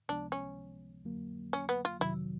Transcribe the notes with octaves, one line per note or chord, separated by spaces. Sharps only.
C#2 C3 F3 G#3 B3 D4
C#4
F2 D3 F#3 A#3
C#4
B3
F4
F2 C3 D#3 F#3 E4